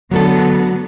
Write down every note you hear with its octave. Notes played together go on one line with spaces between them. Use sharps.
D3 F#3 A3 B3 A4